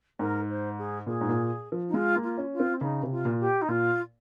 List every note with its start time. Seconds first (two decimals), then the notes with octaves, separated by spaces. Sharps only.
0.19 G#2 A#4
0.49 C5
0.78 G#4
1.06 A#2 G#4
1.21 G#2
1.29 A#2
1.72 F3
1.88 D#4
1.94 G#3 F4
2.16 A#3
2.23 F4
2.38 C#4
2.52 F4
2.60 C4
2.81 C#3 D#4
3.03 C3
3.11 F4
3.25 A#2
3.40 G4
3.61 D#4
3.68 A#2 F4